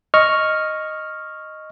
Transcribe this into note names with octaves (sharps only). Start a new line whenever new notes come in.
D#5 C#6 F6